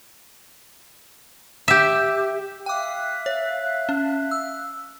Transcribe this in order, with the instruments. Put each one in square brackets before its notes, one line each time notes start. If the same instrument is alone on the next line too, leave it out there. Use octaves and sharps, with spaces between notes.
[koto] G4 E5
[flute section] E5 F5 F#6 [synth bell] G5 D6
[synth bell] C#5
C#4
E6